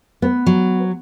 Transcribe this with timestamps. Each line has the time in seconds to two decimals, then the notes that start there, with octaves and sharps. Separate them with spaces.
0.22 B3
0.46 F#3